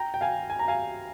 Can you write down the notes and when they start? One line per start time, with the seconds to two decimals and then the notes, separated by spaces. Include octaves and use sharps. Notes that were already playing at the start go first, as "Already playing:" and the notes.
Already playing: G5 A#5
0.14 G5
0.21 F5 G#5
0.50 G#5
0.59 A#5
0.68 F5 G#5